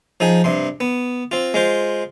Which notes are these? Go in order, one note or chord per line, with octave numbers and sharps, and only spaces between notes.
F3 D#4 G#4
G2 C3 C6
B3
C4 F4
G#3 F4 C5